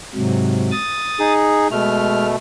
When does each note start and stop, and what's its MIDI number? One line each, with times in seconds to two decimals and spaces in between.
0.15 0.71 44
0.15 0.71 48
0.15 0.71 54
0.71 1.33 87
0.71 1.33 93
1.19 1.68 63
1.19 1.68 68
1.71 2.36 47
1.71 2.26 56
1.71 2.36 57
1.71 2.26 89